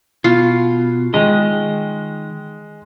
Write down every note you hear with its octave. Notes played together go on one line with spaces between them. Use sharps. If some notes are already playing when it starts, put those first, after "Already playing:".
B2 F4
D#3 G#3 D#5